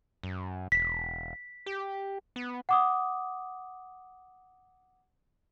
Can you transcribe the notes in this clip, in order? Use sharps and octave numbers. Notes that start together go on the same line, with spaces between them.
F#2
E1 B6
G4
B3
F#5 D6 D#6